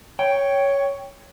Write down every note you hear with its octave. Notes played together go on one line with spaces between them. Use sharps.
C#5 G5